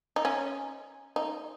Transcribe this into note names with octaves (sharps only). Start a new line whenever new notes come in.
D#4
C#4
D#4